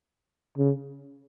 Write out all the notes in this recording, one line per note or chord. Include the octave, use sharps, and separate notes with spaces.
C#3